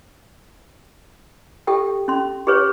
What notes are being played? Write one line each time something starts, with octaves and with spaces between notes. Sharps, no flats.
G4 A4 G5
C#4 C6
G4 G#4 B4 C#5